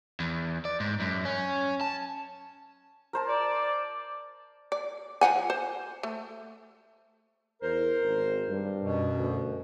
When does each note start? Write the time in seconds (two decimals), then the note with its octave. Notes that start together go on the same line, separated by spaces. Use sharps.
0.20 E2
0.65 D5
0.80 G#2
1.00 F#2
1.25 C#4
1.81 A5
3.13 A#4 C5 A5
3.28 D5
4.72 D5
5.21 F3 F#5 G#5
5.50 C5
6.03 A3
7.62 E2 A#4 C5
8.02 G#1
8.48 G2
8.82 F#2 B2
9.17 D2